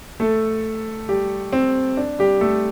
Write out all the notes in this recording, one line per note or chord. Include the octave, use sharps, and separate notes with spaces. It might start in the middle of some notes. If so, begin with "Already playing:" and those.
A3 A4
G3 G4
C4
D4
G3 G4
A3 A4